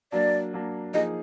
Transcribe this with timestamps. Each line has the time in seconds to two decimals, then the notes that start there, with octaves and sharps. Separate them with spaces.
0.12 F#3 A#3 D4 D5
0.53 F#3 A#3 D4
0.94 F3 A#3 D#4 G#4 D#5